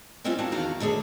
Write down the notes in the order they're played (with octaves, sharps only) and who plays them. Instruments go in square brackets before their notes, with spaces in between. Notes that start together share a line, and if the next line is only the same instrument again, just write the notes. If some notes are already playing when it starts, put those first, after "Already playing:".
[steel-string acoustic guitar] G3 G#3 C4 C#4 E4 F4
A#3 C4 D4 F#4
E2 D#3 F#4 G4 F5 A#5
D#2 D3 A3 G#4